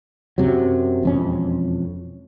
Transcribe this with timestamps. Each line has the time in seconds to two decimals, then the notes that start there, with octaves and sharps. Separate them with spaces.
0.38 F#2 C3 F#3
1.03 E1 F2 C#4